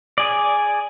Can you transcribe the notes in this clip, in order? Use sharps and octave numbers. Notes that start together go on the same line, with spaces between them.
G#4 D5